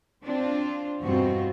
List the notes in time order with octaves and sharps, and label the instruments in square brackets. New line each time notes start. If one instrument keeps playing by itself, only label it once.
[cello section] C4 D4 F4
E2 G2 B2 C4 F4 F#4